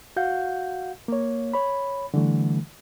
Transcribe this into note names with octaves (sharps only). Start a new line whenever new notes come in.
F#4 F5 F#5 G6
A#3 C#5
C#5 B5
D3 E3 G3 A3